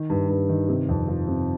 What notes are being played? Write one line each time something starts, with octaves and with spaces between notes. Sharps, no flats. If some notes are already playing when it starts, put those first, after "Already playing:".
Already playing: D#3
G2
G2
D#3
C3
F2
F3
C3